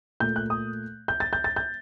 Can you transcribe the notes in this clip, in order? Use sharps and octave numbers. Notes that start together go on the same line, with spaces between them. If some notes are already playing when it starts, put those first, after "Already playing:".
A#2 A3 G6
F#6
D#6
G6
A6
G6
A6
G6